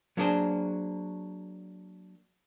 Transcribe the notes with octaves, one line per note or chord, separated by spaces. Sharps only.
F#3 A#3 D4 G#4 C5